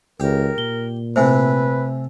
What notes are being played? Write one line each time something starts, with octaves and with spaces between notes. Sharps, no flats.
C#2 G4 A#4
A#2 G7
A2 C3 B4 C5 E5 G#5